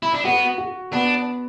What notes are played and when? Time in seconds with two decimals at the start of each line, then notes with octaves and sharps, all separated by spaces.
0.03 E4
0.13 D4
0.25 B3 F#4
0.58 F#4
0.93 B3 D4